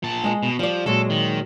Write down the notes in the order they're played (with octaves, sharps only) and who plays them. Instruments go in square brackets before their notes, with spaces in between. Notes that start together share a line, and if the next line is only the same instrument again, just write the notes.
[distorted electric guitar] A#2 A5
[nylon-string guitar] G#3 D#5
[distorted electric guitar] B2
[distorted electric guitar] F3 [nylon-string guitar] G3 D5
[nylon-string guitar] A#2 F#3 G#3 [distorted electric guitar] A4
[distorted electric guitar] D#3